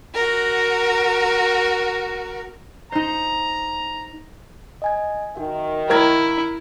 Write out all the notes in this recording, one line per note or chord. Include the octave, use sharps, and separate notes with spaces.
F#4 A#4
D#4 C5 A#5
D#5 G#5 G#6
D#3 F#4 E5
E4 A#4 F5 A#5 G#6